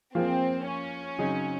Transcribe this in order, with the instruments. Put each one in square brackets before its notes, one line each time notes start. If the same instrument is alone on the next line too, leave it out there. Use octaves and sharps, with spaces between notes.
[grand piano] F3 A#3 F4 G#4 [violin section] C4
[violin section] C#4
[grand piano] C#3 F#3 C4 D#4 G#4